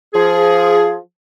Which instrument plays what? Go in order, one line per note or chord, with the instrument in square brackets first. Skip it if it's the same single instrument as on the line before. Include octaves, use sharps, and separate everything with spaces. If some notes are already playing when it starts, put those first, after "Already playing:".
[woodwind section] F3 G#4